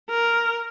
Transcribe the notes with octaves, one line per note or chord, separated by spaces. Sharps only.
A#4